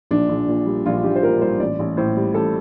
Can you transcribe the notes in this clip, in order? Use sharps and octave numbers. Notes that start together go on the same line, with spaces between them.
A#1 D4
A#1
A#2
G3
A#1 F4
A#1 G4
C5
A#2 A#4
G3 C5
A1 D5
A1
A2 C5
G3
A1 A4